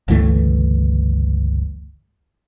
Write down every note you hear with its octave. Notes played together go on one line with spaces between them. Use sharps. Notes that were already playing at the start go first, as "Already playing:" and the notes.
G1 C#2 E3 A3